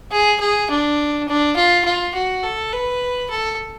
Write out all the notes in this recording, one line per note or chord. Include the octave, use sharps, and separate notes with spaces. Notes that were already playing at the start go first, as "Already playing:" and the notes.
G#4
G#4
D4
D4
F4
F4
F#4
A4
B4
A4